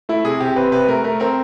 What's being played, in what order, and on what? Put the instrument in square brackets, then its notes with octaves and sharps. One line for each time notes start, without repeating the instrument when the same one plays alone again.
[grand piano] A3 E4
C3 G#4
C3 G4
C4 B4
C3 B4
A3 A#4
A3 A#4
C4 A#4